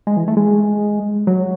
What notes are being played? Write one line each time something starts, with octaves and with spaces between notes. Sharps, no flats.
G#3
E3
A3
G#3
F#3